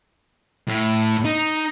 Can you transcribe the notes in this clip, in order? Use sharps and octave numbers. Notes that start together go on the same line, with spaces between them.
A2
D#4